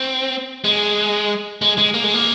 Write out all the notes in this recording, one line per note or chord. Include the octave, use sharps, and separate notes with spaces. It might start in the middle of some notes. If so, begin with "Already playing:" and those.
Already playing: C4
G#3
G#3
G#3
A#3
G#3
A#3